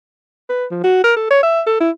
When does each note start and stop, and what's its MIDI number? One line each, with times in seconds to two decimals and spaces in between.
0.50 0.65 71
0.71 0.81 53
0.84 1.02 66
1.04 1.14 70
1.17 1.30 69
1.31 1.41 73
1.43 1.62 76
1.67 1.80 69
1.80 1.90 64